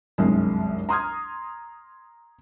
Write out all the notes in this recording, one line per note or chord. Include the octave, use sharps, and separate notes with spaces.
G1 C2 F#2 G#3
A#5 C6 D#6 F6 G#6